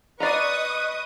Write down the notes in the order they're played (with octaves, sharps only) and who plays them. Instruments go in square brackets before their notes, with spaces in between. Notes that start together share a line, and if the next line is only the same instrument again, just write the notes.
[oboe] B4 [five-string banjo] D5 F5 A#5 [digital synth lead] D#5 [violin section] C#6 D#6